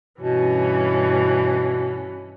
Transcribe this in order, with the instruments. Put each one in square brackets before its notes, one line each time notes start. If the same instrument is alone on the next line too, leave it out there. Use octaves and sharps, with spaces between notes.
[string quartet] G2 E3 C#4 [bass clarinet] B2